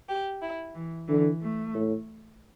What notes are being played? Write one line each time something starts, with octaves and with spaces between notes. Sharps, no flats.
G4
E4
E3
D3 E3
A3
A2